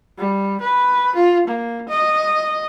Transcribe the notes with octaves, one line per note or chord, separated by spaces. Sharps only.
G3
B4
F4
A#3
D#5